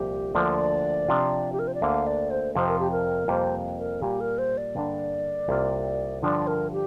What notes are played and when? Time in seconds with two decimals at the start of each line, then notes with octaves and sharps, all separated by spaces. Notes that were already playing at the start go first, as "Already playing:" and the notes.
Already playing: C2 A#2 F3 C4 F4 G4
0.35 D2 D3 F3 A#3 D4 D5
1.08 C3 F3 D4 F4
1.52 G4
1.59 A#4
1.67 C5
1.74 D5
1.82 D2 D3 A#3 F5
2.07 D5
2.30 C5
2.55 F2 C3 F3 C5
2.67 A#4
2.79 G4
2.91 A#4
3.28 F2 C3 G3 A#3 F4 C5
3.78 A#4
4.02 A#2 G3 A#3 G4
4.20 A#4
4.38 C5
4.57 D5
4.76 G2 D3 A#3 D4
5.49 C2 C3 A#3 F4
6.23 G2 D3 F3 D4 D5
6.47 A#4
6.72 G4